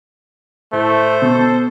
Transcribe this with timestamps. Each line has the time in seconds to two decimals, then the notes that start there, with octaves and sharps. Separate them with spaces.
0.73 A2 A3 C5
1.22 B2 A4